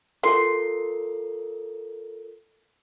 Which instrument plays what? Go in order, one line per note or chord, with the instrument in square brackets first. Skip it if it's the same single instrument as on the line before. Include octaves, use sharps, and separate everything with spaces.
[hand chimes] F4 A4 A#4 [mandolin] C6